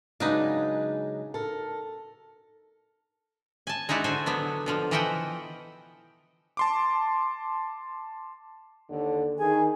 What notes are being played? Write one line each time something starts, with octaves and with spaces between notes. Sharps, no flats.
C#3 F#3 G#3 D4 D#4 B4
A4 A#4
G#5 A5
G#3 D#4 E4 F#4 D5
D3 F#4 A4 C5 G#5
F#3 B3 D4
B2 D3 F3
E3 F3 D#5 E5 F#5 G5
A5 C6 D6
D#2 D3
D#3 G#4 G#5